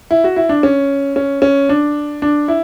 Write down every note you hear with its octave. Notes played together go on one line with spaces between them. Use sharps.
E4
F#4
E4
D4
C#4
C#4
C#4
D4
D4
E4